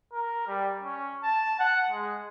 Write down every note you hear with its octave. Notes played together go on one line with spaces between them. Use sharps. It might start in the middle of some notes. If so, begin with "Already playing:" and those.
A#4
G3
C#4
A5
F#5
G#3